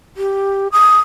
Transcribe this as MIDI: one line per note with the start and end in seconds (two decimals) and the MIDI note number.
0.17 0.67 67
0.72 0.97 87